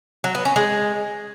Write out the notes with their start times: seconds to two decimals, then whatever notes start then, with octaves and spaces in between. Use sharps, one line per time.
0.24 F#3
0.35 B3
0.45 C#4
0.56 G#3